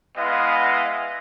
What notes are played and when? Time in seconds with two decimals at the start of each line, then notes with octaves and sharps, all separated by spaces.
0.17 G#3 B3 E4 B4 D#5 F5